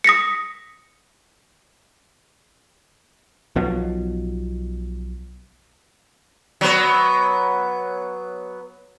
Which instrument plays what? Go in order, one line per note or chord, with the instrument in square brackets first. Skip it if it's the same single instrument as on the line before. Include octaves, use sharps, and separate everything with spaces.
[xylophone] D#6 A#6 B6 C#7
[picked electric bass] B1 B2 F3 F#3
[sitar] F#3 B3